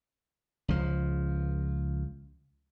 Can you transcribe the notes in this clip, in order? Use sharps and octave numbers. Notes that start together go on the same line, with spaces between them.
C#2 F3